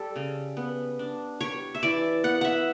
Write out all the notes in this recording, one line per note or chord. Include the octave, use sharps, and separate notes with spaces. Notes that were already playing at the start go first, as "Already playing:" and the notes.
Already playing: G3 A4
C#3
B3
D4
G3 C#5
E5
E3 D5
B3 F#5
E5 F#5